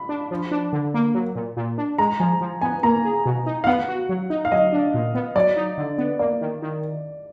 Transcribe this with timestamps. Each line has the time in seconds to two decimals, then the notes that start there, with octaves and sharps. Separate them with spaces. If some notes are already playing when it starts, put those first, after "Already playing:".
Already playing: B5
0.09 D4
0.31 F3
0.51 D4
0.73 D3
0.94 A#3
1.14 F#3
1.35 A#2
1.57 A#2
1.78 D4
1.98 G#3 A#5
2.20 F3 G#5
2.41 F3
2.61 B3 G#5
2.83 A#3 A#5
3.04 G#4
3.26 B2
3.46 D#4
3.64 F5
3.67 B3 F#5
3.88 F#4
4.09 F#3
4.30 D#4
4.45 F5
4.52 F#3 D#5
4.72 D4
4.94 A#2
5.15 B3
5.36 F#3 D5
5.56 D#4
5.78 D3
5.98 B3
6.19 A#3 D5
6.41 D#3
6.62 D#3